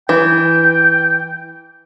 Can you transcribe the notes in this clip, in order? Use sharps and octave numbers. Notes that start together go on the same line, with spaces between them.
E3 G5